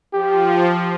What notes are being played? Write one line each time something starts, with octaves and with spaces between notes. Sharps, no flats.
F3 G4